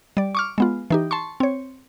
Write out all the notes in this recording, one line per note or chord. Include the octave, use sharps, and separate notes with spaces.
G3 D5
C#6 D6 F6
G#3 B3 F4
E3 D#4 G4
A5 C6 C#6
C4 C#5